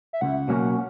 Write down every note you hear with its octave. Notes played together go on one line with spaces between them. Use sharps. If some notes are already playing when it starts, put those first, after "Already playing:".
E5
C#2 F#5
B2 F#3 A#3 C#4